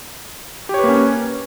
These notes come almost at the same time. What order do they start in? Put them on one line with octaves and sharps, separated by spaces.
G4 C#5 B4 A#3 C#4